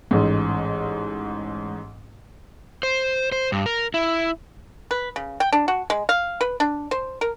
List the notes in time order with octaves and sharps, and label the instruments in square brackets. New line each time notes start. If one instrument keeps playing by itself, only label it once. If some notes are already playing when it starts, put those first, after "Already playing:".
[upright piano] A1 G#2
[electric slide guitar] C5
C5
G2
A#4
E4
[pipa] B4
C#3
G5
D4
F#4
G#3
F5
B4
D4
C5
A#4